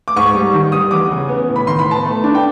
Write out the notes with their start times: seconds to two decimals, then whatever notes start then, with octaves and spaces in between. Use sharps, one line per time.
0.08 D6
0.16 G#2 C#6
0.35 G3
0.53 D#3
0.72 G3 D#6
0.91 E2 D6
1.11 C#3
1.29 B3
1.48 A2
1.56 B5
1.67 D#3 C6
1.79 B5
1.86 B3
1.91 A5
2.05 A3
2.24 D4
2.35 G5